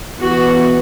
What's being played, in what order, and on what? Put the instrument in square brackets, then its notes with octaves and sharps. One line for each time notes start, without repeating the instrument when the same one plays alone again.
[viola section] E3 B3 F#4